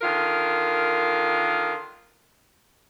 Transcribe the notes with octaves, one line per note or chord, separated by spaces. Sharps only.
D3 D#3 F4 A#4